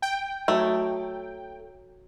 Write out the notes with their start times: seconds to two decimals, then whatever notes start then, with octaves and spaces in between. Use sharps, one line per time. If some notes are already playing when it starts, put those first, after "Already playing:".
0.02 G5
0.48 F#3 A3 D#4 C#5